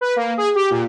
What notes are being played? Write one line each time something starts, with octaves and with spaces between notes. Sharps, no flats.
B4
A#3
G#4
G4
A#2